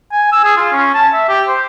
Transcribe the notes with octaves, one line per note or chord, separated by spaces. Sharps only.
G#5
E6
G#4
F4
C#4
A5
E5
G4
C5